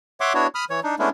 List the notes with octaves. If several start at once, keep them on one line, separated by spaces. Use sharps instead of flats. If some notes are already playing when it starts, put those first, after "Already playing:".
C#5 E5 F#5 C6 D6
B3 D4 E4 F#4 C#5
B5 D#6 F6
E3 C#5
D4 D#4
G#3 A3 B3 C#4 D4 E4